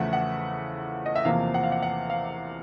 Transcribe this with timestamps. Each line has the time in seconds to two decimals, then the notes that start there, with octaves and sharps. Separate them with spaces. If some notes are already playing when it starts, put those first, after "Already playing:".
Already playing: E2 C#3 F3 A3 E5 F#5
0.13 F#5
1.06 D#5
1.16 E5
1.25 E2 C3 F3 A#3 F5
1.54 F#5
1.63 F5
1.72 F#5
1.83 F#5
2.10 F5